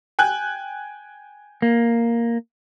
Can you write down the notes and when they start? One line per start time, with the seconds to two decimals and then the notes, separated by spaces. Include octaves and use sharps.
0.19 G5 G#5 F#6
1.62 A#3